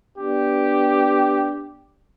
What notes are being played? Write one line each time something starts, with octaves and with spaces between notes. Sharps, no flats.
B3 D4 G4